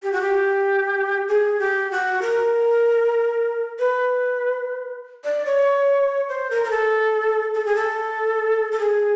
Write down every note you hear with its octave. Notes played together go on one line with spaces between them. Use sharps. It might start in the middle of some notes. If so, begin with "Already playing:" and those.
G4
F#4
G4
G#4
G4
F#4
A#4
B4
D5
C#5
C5
A#4
A#4
A4
A4
G#4
A4
A4
G#4